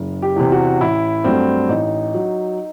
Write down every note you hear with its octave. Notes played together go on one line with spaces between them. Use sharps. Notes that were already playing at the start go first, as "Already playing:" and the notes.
Already playing: F#1
G4
E2 C3
F#4
A1 E4
G2 F#3 A3 C4
A1 D#4
F#3